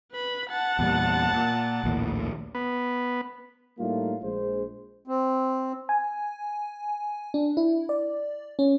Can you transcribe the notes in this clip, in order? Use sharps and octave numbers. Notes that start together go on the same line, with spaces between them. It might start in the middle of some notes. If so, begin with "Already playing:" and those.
B4 B5
F#5 A5
E2 A#2 G3
A#2
A#1 D#2 A2
B3
A2 G3 A3 A#3 D#4 F4
A#1 G#3 C5
C4
G#5
D4
E4
D5
C#4